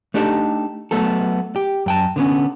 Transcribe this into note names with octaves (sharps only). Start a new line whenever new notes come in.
A3 D4 D#4 G4 A4
F#3 A3 B3 A4
G4
F#2 G5 A5
D3 B3 C#4